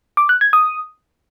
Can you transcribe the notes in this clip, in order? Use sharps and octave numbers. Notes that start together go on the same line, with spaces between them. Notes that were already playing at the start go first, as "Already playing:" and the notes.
D6
F#6
G#6
D#6